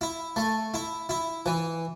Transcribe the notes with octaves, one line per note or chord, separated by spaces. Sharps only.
E4
A3
E4
E4
E3